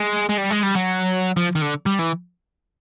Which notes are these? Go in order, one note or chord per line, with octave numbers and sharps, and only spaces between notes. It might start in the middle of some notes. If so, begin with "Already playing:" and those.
Already playing: G#3
G#3
G3
G#3
G3
F#3
F3
D#3
D3
G3
E3